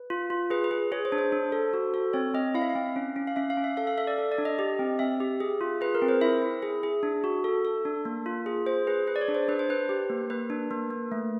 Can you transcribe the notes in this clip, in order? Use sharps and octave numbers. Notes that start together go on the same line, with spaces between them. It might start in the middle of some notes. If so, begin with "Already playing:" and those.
Already playing: B4
F4
F4
G#4 B4
B4
G#4
G#4 C#5
C5
D4
C5
D4
A4
F#4
A4
C4 C#5
C4 D#5
E4 F5
E5
F5
C4
C#4
C#4
F5
C#4 E5
F5
C#4
E5
A4 F5
F5
A4 E5
D5
A4
D5
D4
D#5
G4
C4
C4 E5
G4
G#4
F4
G#4 B4
A#4
C4
C5
E4 E5
E4
G#4
G#4
D4
F#4
A4
A4
D4
A#3
F4
G#4
G#4 C5
G#4 B4
G#4 B4
D5
C#5
D4
C5
D4 B4
C5
D4 B4
G4
A#3
A#3 B4
D4
A#3
A#3
A3